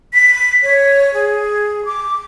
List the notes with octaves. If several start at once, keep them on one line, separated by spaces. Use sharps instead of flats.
B6
C#5
G#4
D6